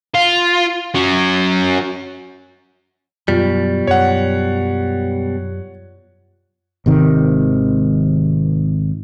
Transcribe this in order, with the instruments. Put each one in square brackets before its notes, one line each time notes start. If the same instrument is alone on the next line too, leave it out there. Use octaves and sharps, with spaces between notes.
[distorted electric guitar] F4
F#3 C#4
[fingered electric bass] F#2 F#3 [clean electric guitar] B2 G3 [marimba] F4
[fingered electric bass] F#2 F#3 [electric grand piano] C#5 F#5
[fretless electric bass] G#1 C3 D#3